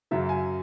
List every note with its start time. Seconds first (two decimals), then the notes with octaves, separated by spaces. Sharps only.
0.11 F#2 C#3 F#3 E5
0.29 G#5